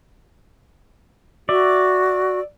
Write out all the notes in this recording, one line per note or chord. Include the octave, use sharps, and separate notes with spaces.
F#4 D5 E5